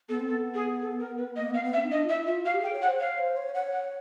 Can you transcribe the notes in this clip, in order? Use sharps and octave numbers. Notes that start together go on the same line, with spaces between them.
B3 A4
C4
A4
B3
G#4
A4
A#4
B4
A#3 D#5
B3 F5
B3
E5
C#4
D#4
D4 D#5
F4
E4 E5
F4 E5
F#4 F5
G4
G#4 G5
C#5
F#5
C5
C#5 F5
C5
C#5
C#5 F#5
F#5